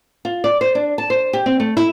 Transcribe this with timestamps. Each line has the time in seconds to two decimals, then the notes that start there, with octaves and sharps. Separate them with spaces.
0.25 F4
0.44 D5
0.61 C5
0.75 D4
0.98 A5
1.10 C5
1.33 G4
1.46 C4
1.60 A3
1.77 E4